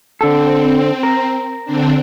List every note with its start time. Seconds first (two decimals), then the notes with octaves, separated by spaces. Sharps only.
0.21 D3 C4 A4
1.03 A#4
1.65 D3 C4 D4